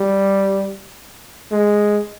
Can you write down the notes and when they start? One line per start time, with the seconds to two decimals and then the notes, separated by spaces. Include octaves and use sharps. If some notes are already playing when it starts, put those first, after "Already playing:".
Already playing: G3
1.52 G#3